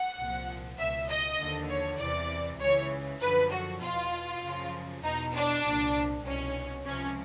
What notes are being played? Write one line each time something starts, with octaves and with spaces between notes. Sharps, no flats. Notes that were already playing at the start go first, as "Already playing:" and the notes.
Already playing: F#5
C2 A#2 F3
C#2 B2 E5
D#5
D#2 D3 F3
C#5
E2 C3 E3 D5
C#2 C#3 E3 C#5
F#2 D3 F3 B4
F#4
E2 B2 F4
F#2 C#3 F3
E2 B2 D#4
D4
C2 A#2 F3
C2 B2 C#4
C#2 C3 F3 C#4